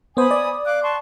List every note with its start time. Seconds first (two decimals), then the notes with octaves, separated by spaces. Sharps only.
0.17 B3 C5 G#5 B5 D#6
0.31 D5
0.65 F5 D6 F#6
0.83 A5 C6 C#6